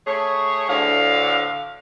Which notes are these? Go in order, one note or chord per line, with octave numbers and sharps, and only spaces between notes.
A3 G#4 C#5
D2 A2 D3 F5